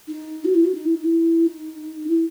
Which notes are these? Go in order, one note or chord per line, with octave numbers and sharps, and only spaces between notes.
D#4
F#4
E4
F#4
D#4
E4
D#4
E4
D#4
E4